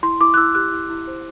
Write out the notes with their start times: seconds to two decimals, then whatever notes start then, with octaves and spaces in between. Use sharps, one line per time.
0.03 E4 C6
0.20 E4 D6
0.34 F#6
0.37 E4 E6
0.55 G4 F#6
0.72 E4
0.90 E4
1.07 C5